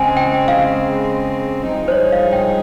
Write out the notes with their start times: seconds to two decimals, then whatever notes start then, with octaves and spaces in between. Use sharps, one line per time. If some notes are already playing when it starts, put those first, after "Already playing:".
Already playing: C#3 G#3 C4 G5 G#5
0.17 G5
0.48 F5
1.71 G2 F3 G#3 D#4 G#4
1.88 C5
1.92 C#5
2.12 F5
2.33 G5